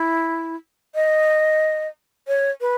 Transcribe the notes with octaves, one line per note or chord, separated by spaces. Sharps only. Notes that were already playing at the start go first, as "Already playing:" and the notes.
Already playing: E4
D#5
C#5
B4